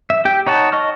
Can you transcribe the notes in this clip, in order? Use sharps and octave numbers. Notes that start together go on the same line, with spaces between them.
E5
G4 G5
D#4 C#5 F#5 A5
D#5 C#6 F6